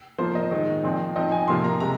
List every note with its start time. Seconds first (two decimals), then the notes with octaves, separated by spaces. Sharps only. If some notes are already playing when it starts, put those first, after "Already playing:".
0.18 F3 A#3 F4 C5
0.35 D#5
0.51 D#3 G#3 D#4
0.83 A#2 F3 C4
1.16 F3 C4 D#4 D#5
1.32 G#5
1.48 C3 F3 A#3 F4 C6
1.64 A#5
1.80 C3 G#3 A#5